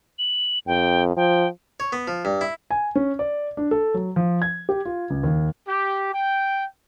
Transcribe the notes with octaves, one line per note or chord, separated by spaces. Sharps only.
F#7
F2 G5
F3 G5
C#5
B3
F3
G2
E4
G#5
C#4
D5
D4
A4
F#3
F3
G#6
G4
F4
C#2
D#2
G4
G5